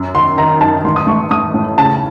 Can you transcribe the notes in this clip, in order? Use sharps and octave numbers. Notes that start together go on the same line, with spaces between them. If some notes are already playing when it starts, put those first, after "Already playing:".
Already playing: F#2
D#3 C6
D#3 A#5
F#2 A5
A1 C6
D#6
A3 C#6
A3 D#6
A2
C#3 A5